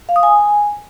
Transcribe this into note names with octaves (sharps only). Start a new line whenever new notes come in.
F5
D#6
G#5